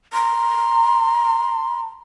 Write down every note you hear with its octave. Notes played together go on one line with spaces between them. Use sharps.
A#5 C6